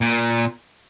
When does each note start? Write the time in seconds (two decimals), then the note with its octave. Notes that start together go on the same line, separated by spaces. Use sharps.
0.01 A#2